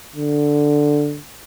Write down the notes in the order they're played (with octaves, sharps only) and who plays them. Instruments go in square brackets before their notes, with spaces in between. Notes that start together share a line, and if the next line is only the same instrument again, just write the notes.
[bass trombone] D3